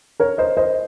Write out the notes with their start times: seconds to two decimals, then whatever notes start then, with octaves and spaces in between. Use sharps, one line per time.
0.20 A#4 C#5
0.38 C5 D#5
0.57 C5 D#5